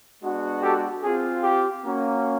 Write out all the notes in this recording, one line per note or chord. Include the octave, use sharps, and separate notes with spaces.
G#3 B3 D4 F#4
G4 A4
C4 F4 G#4
G4
A#3 C#4 F#4